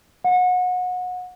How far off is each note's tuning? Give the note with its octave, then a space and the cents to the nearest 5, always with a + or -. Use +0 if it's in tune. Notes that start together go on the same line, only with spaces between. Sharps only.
F#5 -30